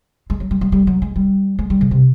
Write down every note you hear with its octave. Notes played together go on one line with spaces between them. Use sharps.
G#3
F#3
G3
G3
G3
F#3
G#3
G3
G#3
G3
C#3
C3